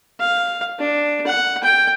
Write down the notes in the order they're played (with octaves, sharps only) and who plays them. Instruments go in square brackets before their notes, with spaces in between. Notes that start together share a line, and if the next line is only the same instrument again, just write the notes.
[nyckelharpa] F5
D4
F#5
G5